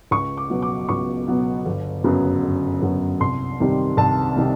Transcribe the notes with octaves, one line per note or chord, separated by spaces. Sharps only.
C#2 C#6
D6
B2 F#3 B3
D6
C#2 C#6
B2 F#3 B3
G1
F#2 C#3 F#3 B3
G1
F#2 C#3 F#3 B3
C2 C6
C3 D#3 G3
C2 A5
C3 D#3 G3